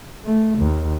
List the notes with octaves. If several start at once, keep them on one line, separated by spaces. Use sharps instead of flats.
A3
D#2